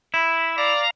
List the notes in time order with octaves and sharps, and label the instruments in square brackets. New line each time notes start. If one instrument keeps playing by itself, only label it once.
[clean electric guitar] E4 [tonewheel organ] E5
[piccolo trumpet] D5 [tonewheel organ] F5 A#5